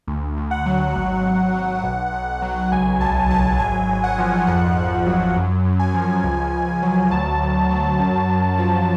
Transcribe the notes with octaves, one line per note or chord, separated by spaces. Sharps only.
D2
D2
F#5
F#3
G#1
G#1
F#3
B1
B1
F#3
C#2 G#5
C#2 A5
F#3 A5
G#1 G#5
G#1
F#5
F3
F2 F#5
F2
F#3
F#2
F#2
G#5
F3
C#2
C#2
F#3
D2 A5
D2
F#3
F#2
F#2
F3